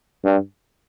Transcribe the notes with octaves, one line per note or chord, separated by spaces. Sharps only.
G2